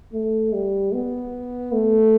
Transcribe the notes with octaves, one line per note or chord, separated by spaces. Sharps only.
A3
G3
B3
A3